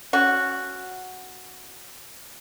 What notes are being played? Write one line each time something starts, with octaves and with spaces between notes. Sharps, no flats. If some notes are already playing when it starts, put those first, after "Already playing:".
C#4 F#4